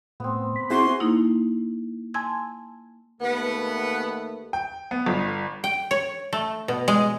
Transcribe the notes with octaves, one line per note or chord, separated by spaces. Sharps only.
A2 B3 C4
B5
C4 E4 F#4 G#4 G#5 C6
A#3 D#4 E4
G#5 A5 C6 E6 G#6
D#2 A3 B3 B4
G5
B3
G1
G5
C#5
A3
B2
G#3